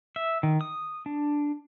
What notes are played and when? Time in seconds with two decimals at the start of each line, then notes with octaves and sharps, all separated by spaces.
0.16 E5
0.43 D#3
0.61 D#6
1.06 D4